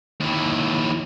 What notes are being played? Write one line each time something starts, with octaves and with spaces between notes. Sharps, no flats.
D#2 E3